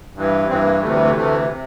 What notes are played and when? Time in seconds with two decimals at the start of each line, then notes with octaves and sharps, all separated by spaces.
0.15 G2 E3
0.48 G2 E3 C4
0.65 A#3
0.82 D2 C3 E3 A3
0.93 G3
1.05 A3
1.15 D2 C3 E3 A3
1.50 C3